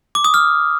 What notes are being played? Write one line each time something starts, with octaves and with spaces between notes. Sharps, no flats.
D6
D#6
F6